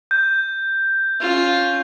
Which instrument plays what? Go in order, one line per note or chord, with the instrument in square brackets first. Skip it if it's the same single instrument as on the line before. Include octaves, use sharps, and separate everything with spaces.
[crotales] G6
[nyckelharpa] C#4 F4